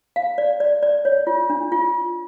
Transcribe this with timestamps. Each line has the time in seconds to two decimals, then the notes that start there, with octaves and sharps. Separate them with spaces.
0.16 F5
0.38 D5
0.60 D5
0.83 D5
1.05 C#5
1.27 F4
1.50 D4
1.72 F4